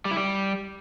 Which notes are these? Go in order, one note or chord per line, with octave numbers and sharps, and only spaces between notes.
G3
E4
G3